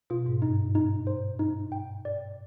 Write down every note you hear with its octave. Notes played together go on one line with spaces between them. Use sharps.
B2 F4
G#2
G2 D#4
D#4
C5
D#4
G5
D5